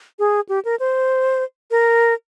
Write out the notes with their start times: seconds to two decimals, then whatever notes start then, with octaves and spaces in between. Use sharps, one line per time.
0.19 G#4
0.49 G4
0.65 A#4
0.80 C5
1.71 A#4